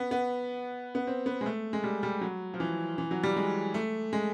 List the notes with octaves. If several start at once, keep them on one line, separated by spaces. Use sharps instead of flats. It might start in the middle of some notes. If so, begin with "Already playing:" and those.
Already playing: B3
B3
B3
C4
B3
G#3
A3
G#3
G3
G3
F#3
F3
E3
E3
F#3
G3
G#3
A3
G#3